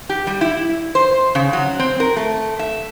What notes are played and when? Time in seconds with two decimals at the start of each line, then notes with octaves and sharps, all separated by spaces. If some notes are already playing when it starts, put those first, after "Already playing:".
0.09 G4
0.27 G3
0.41 E4
0.95 C5
1.35 C#3
1.53 F#3
1.79 C4
2.00 A#4
2.17 A3
2.59 E5